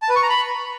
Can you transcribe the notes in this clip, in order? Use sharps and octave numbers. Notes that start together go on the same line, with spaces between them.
A5
B4
C#6
A#5
B5